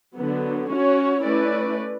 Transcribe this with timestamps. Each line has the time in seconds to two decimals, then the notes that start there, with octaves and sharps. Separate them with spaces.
0.16 D3 F#3 B3
0.69 C#4 F#4 C#5
1.22 A3 C#4 E4 B4 D5